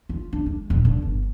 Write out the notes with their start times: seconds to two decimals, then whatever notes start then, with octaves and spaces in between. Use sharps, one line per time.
0.09 F4
0.33 D4
0.46 G#3
0.70 D#1
0.85 D3
1.02 G1